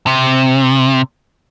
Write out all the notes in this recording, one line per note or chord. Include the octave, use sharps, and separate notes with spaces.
C3